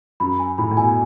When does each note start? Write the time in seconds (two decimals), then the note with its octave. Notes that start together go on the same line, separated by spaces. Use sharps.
0.20 F#2 B5
0.39 G#5
0.58 A2 B5
0.71 A2
0.77 B2 G#5